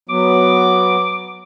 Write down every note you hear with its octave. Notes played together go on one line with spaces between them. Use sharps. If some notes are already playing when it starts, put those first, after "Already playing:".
F#3 B3 D6